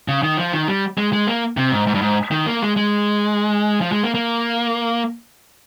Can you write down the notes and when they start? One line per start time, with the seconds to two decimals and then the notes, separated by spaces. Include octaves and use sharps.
0.08 C#3
0.23 D#3
0.37 F3
0.53 D#3
0.68 G3
0.98 G#3
1.13 G#3
1.27 A#3
1.57 C3
1.72 G#2
1.87 G#2
1.94 G2
2.02 G#2
2.31 D#3
2.46 A#3
2.61 G#3
2.76 G#3
3.81 F3
3.92 G#3
4.04 A#3
4.15 A#3